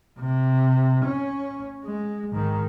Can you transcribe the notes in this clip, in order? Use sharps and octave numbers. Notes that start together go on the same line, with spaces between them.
C3
C#4
G#3
G#2 D#3